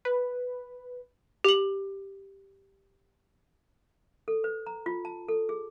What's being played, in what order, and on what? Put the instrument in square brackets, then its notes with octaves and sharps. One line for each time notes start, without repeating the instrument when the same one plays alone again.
[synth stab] B4
[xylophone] G4 F#7
[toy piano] A4
B4
A#5
F4
A5
A4
G#4